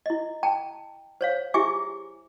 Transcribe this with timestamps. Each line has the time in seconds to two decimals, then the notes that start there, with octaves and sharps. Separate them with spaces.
0.06 E4 D#5
0.43 G5 A5 A#5
1.21 C5 C#5 F5
1.54 E4 G4 G#4 E5 G#5 D6